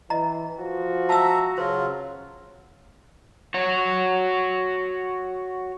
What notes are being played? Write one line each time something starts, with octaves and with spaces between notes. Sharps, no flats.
E3 D#5 A#5
F3 F#4
E5 A5 A#5 E6
C#3 F#3 F4 C5
F#4 C#5